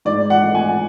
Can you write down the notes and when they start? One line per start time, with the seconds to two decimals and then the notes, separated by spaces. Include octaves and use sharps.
0.05 G#2 D5
0.30 F#5
0.42 A3
0.55 G#5